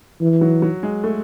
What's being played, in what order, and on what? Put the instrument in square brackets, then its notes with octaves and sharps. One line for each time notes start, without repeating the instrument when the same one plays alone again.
[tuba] E3
[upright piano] F#3
F#3
G#3
A3